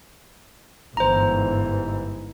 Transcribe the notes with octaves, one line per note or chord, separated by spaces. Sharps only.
G1 G#2 E3 C5 A#5